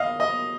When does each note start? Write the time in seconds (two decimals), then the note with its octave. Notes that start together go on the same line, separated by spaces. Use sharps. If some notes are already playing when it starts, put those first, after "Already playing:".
Already playing: D#5 F5
0.20 D#5